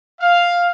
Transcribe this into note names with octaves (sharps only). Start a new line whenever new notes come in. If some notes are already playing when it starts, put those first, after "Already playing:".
F5